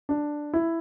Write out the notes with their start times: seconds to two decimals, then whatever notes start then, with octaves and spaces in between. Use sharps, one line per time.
0.09 D4
0.54 E4